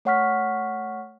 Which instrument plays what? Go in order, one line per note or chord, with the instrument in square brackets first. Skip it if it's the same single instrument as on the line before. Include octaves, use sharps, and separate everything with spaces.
[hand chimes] A3 C#5 F#5 C#6 F6 B6